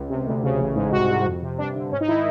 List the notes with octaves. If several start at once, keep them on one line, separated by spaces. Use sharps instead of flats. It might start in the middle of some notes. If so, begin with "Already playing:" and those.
Already playing: C#2
C3
D2
C#3
A1
G#2
C2 F#4
C3
F2
C3
G2 D4
D3
G#2 C#4
D#4
D#3 E4